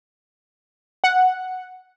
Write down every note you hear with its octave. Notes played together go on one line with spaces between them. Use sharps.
F#5